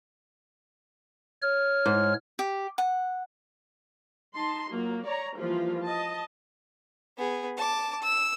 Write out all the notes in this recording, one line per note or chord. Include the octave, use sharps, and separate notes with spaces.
C#5 F6
G#2
G4
F#5
D#4 A5 C6
F#3 A#3 F4
C#5 D5 A#5
E3 F3 G3 A#3 F4
D#5 A5
B3 G#4
A5 D6
E6